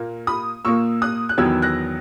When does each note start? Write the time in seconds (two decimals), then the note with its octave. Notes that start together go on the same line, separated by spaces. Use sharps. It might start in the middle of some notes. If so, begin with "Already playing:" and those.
Already playing: A#2 A#3
0.27 B5 D#6
0.65 A#2 A#3 C#6 E6
1.02 D#6 F#6
1.29 F#6
1.37 E2 D#3 F#3 B3 E6 G#6
1.62 F#6 A#6